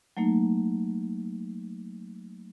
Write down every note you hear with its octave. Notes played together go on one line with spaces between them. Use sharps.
F#3 A3 A#3 D#4